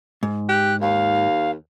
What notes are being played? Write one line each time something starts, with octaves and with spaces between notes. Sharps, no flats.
G#2
G4 F#6
D#2 F5